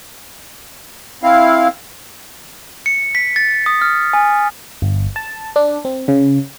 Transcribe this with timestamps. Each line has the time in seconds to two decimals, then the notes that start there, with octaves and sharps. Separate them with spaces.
1.23 C4 E4 F5
2.86 C#7
3.15 B6
3.36 A6
3.66 D#6
3.82 F6
4.13 G#5
4.82 G1
5.16 A5
5.56 D4
5.85 C4
6.08 C#3